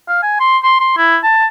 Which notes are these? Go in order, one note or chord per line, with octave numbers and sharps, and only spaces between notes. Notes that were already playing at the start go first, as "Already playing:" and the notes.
F5
G#5
C6
C6
C6
E4
A5